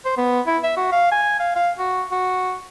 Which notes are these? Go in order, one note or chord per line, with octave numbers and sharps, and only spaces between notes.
C5
B3
E4
E5
F#4
F5
G#5
F5
F5
F#4
F#4